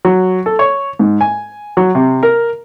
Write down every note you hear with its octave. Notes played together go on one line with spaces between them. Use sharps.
F#3
A4
C#5
G#2
G#5
F#3
C3
A#4